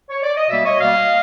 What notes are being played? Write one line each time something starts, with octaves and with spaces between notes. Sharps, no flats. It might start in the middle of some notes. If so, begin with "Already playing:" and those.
C#5
D5
D#5
B2 G3 A#3 D5 E5
C#5 D#5
B2 G3 A#3 D#5 F5